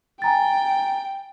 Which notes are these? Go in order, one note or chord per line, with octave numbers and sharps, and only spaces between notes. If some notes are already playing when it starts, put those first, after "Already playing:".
G5 G#5 A#5 A6